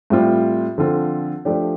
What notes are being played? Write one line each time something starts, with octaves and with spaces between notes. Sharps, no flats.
A2 G3 C4 F4
D3 F3 C4 F4 A4
F3 A3 D4 G4 D5